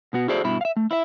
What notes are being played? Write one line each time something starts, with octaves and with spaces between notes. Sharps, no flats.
B2 B3 F#4
E4 F#4 G#4 A4 C5 D5
G2 B2 E4 B5
E5 F5
A3
E4 E5